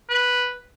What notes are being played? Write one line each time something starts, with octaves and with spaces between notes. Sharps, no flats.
B4